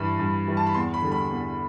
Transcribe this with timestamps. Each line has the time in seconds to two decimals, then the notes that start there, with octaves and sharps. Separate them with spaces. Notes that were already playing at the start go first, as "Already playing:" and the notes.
Already playing: G2 E3 G3 B5
0.19 G2
0.47 E3 G3
0.57 A5
0.66 B5
0.74 E2 C6
0.94 B5
1.02 D3 G3
1.12 B5
1.31 E2